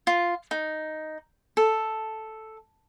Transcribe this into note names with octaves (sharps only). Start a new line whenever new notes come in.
F4
D#4
A4